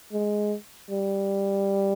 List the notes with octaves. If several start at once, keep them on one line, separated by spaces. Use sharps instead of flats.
G#3
G3